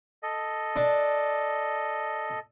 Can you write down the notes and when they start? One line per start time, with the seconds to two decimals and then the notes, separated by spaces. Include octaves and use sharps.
0.23 A4 D#5
0.76 D4